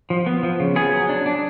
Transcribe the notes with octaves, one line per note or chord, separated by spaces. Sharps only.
F3
B3
F3
C#3
B3 G#4
F#3
D4
D4